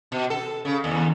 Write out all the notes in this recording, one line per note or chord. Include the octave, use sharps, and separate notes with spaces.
B2
A4
C#3
D#2